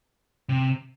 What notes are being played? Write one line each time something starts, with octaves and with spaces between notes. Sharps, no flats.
C3